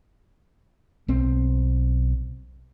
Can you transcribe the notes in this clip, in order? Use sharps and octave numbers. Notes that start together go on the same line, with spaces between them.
B1 C4